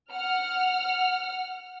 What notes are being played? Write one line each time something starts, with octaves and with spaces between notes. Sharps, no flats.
F#5 F6